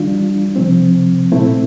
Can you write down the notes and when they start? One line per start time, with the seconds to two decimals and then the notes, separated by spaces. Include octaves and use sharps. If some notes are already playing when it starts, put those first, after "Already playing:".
Already playing: E3 G3 D4 F4
0.56 C3 F3 C4
1.32 A#2 A3 C4 E4